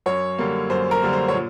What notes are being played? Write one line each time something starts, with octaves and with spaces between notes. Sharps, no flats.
F#2 C#5
D3 G3 A#3
F#2 C5
A#4
D3 G3 A#3
C5
C#5
A#2